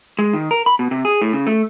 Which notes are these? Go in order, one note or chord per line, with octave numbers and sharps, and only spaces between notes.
G#3
D#3
A#4
B5
B2
C3
G#4
A2
C#3
A3